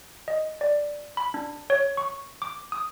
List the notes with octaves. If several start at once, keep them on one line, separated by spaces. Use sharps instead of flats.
D#5
D5
B5
D4
C#5
C#6
D6
D#6